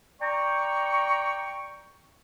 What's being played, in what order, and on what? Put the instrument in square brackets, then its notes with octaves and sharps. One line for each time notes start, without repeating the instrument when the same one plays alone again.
[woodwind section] D5 G5 A#5 C#6